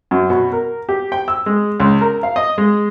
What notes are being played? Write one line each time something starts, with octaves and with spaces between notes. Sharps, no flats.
F#2
B2
A#4
G4
G5
E6
G#3
C#2
A#4
F5
D#5
G#3